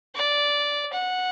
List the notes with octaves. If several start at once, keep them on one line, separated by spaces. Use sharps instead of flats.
D5
F#5